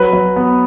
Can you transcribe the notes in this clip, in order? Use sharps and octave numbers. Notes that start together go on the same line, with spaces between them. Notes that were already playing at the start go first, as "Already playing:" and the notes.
Already playing: F#3 B4
F#3
B3